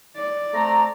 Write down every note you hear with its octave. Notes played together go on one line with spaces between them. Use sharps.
D5
A3 C4 A#5